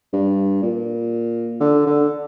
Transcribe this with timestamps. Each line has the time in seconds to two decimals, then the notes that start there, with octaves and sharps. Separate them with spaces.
0.13 G2
0.63 A#2
1.61 D3
1.87 D3